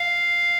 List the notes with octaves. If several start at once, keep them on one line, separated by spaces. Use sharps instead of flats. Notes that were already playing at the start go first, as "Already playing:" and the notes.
Already playing: F5